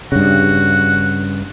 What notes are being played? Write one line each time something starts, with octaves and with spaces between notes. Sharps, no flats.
G2 C#3 F#4